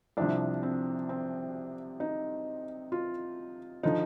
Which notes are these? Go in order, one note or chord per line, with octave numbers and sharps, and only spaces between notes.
C2 C3 F3 D4
C4
C4
D#4
F4
D3 F3 D#4